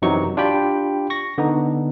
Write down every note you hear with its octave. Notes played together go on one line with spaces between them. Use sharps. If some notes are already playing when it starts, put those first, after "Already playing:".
F#2 C3 E3 F#3 D#4 C#6
D4 F4 G4 G5 B5
C#6 A#6
D3 B3 D#4